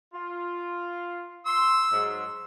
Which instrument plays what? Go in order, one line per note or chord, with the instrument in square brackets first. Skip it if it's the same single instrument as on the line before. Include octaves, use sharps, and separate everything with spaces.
[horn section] F4
[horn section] C6 [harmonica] E6
[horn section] G#2 F#3